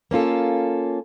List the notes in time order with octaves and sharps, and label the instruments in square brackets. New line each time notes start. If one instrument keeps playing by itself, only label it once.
[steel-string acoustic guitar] A#3 C#4 F4 A4